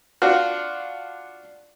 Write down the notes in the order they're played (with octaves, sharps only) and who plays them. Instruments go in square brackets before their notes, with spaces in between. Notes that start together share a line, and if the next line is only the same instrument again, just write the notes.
[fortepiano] D4 F4 F#4